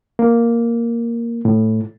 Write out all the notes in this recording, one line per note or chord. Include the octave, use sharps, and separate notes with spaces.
A#3
A2